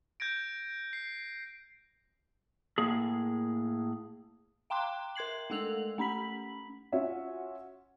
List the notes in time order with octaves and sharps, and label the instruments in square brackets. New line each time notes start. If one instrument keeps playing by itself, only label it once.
[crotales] G6 G#6 A#6 D7
C7
[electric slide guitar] A2 A#3 G#4
[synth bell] F5 G5 A#5 C6 D6 F#6
A#4 C6 G#6 C7 F#7
G#3 A3 A4 E6 F7 F#7
A3 C#4 B5 B6 F#7
[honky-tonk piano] C#4 F4 F#4 C#5 E5